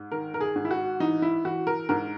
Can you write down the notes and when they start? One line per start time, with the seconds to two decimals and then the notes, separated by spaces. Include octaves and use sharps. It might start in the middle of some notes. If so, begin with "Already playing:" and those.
Already playing: G#2
0.11 D#3 A#4
0.34 A#4
0.41 G#4
0.56 G#2
0.65 E4
0.71 F#4
1.00 E3 D#4
1.22 E4
1.45 E3 F#4
1.67 A#4
1.89 G#2 A#4